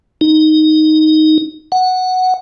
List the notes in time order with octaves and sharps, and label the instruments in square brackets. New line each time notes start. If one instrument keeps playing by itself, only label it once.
[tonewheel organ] D#4
F#5